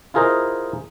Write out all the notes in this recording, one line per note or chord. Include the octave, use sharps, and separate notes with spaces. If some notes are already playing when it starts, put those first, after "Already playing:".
E4 F4 G#4 A#4 C5 D#5